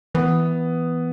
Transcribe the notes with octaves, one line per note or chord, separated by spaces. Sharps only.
E3 B3